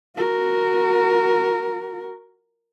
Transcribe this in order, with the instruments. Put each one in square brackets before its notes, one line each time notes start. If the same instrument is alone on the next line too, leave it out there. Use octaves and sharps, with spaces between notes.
[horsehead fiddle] F#4 A#4